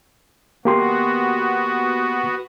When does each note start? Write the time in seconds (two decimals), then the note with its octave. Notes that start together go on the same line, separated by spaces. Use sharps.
0.65 A#3 B3 F#4 G4 C6